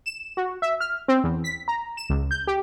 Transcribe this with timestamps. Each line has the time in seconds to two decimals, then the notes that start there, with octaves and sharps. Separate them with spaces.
0.06 E7
0.37 F#4
0.62 E5
0.80 F6
1.08 C4
1.24 E2
1.44 B6
1.68 A#5
1.97 E7
2.10 C#2
2.31 G6
2.47 G4